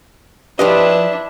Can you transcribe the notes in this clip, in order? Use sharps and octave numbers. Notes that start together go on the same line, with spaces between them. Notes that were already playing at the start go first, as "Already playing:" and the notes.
F3 D4 E4 G4 B4 D#5